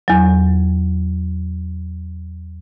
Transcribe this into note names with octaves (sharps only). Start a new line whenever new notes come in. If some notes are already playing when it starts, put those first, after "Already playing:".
E2 F#3